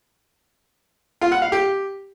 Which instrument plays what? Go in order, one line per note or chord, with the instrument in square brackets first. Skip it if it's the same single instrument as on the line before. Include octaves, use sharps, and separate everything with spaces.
[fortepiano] F4
F#5
F5
G4